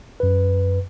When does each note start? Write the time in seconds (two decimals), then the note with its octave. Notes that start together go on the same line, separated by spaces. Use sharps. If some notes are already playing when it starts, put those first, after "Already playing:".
0.20 F#2 B4